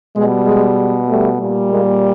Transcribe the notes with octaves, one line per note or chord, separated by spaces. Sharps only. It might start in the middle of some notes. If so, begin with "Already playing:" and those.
B2 G3 G#3
G#3
G3 A3
A#2 G3
G#3 A#3